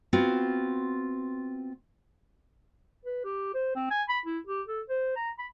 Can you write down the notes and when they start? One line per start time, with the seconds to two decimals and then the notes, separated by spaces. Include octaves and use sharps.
0.13 B3 C4 F4 F#4
3.05 B4
3.24 G4
3.54 C5
3.75 C4
3.90 G#5
4.09 B5
4.26 E4
4.47 G4
4.67 A4
4.89 C5
5.16 A#5
5.38 B5